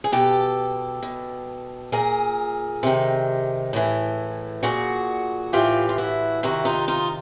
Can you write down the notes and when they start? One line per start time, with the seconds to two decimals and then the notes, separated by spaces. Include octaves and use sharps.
0.04 G#4
0.12 B2 G4 A4
1.02 B2
1.92 A#2 G#4 A#4
2.83 C3 D#3
3.73 A2 E3
4.63 A#2 F#4 G#4
5.53 A2 E3 F4 G4
5.89 F4
5.98 E4 F#4
6.43 C3 D#3 E4 F#4
6.65 D#4 F4
6.88 D#4 F4